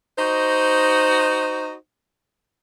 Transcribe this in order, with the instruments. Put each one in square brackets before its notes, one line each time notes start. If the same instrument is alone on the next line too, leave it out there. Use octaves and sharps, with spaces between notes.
[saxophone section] D#4 F#4 C5 D#5